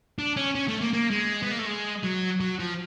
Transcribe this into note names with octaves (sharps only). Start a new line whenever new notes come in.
D4
C#4
C#4
A3
A#3
A#3
G#3
B3
A#3
A3
G#3
F#3
F#3
F3